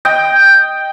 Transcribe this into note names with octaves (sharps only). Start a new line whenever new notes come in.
D#5 G5